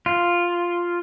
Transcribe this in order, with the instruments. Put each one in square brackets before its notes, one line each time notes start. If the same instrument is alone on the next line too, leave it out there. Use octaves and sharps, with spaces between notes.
[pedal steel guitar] F4